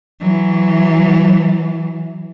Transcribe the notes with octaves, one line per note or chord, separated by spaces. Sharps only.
E3 F#3